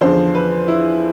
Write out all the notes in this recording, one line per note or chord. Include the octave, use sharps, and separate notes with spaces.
E2 D3 F3 C5
B4
E4